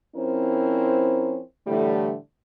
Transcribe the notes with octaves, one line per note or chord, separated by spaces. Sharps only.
F3 C4 C#4 E4 A#4 C5
A2 D3 E3 G3 A3